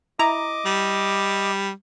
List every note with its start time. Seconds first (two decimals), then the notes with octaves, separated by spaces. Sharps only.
0.19 E4 D#5 A#5 D6
0.66 G3